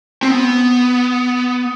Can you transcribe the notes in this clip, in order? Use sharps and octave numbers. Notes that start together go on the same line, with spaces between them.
C4
B3